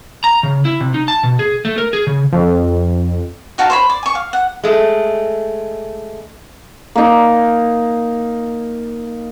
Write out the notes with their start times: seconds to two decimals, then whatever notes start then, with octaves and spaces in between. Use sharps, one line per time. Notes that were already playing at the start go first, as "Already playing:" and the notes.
0.24 A#5
0.43 C#3
0.65 E4
0.80 C3
0.94 D#4
1.08 A5
1.23 B2
1.39 G#4
1.65 A3
1.78 A#4
1.93 G#4
2.07 C#3
2.33 F2
3.58 D#4 F#4 F5 A5
3.70 C5 C#5 B5
3.90 D5
4.03 G#5 C#6
4.15 F5
4.33 F#5
4.64 G#3 A3
6.96 A#3 D#4